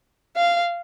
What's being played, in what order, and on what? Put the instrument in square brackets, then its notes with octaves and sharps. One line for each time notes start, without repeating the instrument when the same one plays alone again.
[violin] F5